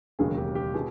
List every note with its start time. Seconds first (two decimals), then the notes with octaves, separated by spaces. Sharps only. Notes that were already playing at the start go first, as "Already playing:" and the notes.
0.19 E1 D#2 C#3 F#3 G#4
0.37 G4
0.55 G4
0.74 B2 G#4